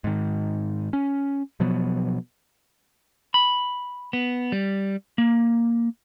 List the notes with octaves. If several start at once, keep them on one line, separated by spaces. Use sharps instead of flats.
G#2 D#3
C#4
B2 F3 F#3 B3
B5
B3
G3
A#3